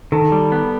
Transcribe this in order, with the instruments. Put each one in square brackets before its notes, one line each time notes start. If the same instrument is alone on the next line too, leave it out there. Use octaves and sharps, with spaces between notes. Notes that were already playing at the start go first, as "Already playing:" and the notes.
[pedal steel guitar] D#3 [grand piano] A4
[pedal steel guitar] G3
B3